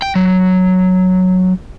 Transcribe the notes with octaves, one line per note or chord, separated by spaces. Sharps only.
G5
F#3